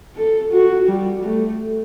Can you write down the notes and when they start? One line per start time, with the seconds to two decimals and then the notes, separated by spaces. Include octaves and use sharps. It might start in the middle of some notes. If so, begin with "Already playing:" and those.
0.16 A4
0.52 F#4
0.87 G3
1.24 A3